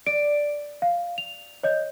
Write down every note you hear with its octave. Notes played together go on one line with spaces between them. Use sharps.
D5 D7
F5
F7
C#5 D#5 G6